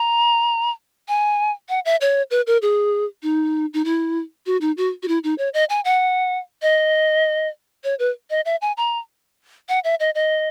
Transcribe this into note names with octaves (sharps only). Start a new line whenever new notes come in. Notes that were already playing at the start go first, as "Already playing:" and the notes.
Already playing: A#5
G#5
F#5
E5
C#5
B4
A#4
G#4
D#4
D#4
E4
F#4
D#4
F#4
F#4
E4
D#4
C#5
D#5
G#5
F#5
D#5
C#5
B4
D#5
E5
G#5
A#5
F#5
E5
D#5
D#5